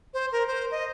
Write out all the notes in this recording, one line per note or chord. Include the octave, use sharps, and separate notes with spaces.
C5
A#4
C5
D#5